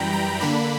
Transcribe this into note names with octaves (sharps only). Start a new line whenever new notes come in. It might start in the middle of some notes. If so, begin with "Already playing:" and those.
Already playing: F#2 E3 G3 G5 A#5 B5
A#5
D3 A#3 D4 B5